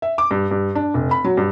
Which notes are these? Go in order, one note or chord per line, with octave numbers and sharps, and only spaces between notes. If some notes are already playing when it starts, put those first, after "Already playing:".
E5
D6
G2
G2
D4
F1
B5
F#3
G2